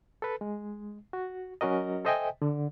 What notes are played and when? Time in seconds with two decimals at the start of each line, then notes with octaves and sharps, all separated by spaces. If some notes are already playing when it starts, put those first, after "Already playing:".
0.22 A4 B4
0.41 G#3
1.13 F#4
1.61 F#3 C#4 F#4 A#4 D#5
2.05 A4 C5 D#5 E5 G5 G#5
2.42 D3